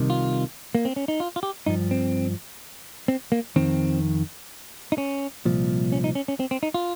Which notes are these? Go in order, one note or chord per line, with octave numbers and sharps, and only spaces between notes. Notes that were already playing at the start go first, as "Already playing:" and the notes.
Already playing: C2 C3 D#3
F4
A#3
C4
C#4
D#4
F4
F4
G4
G2 F3 D#4
C4
C4
A#3
F2 D#3 C4
D#4
C#4
C2 A#2 F3
C#4
D#4
C#4
C#4
C4
C4
D#4
F4